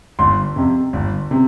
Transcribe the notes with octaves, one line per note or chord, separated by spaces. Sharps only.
G1 C6
F2 C3
G1
C3